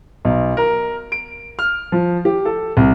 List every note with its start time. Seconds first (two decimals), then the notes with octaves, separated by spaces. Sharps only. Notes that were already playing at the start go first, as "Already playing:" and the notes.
0.25 B1
0.57 A#4
1.12 D7
1.59 F6
1.92 F3
2.25 G4
2.45 A4
2.77 C2